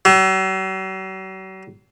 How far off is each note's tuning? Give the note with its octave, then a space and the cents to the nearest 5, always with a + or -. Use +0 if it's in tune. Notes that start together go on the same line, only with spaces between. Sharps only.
F#3 +45